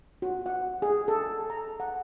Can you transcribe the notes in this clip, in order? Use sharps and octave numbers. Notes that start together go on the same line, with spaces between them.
F#4
F#5
G#4
A4
A#5
F#5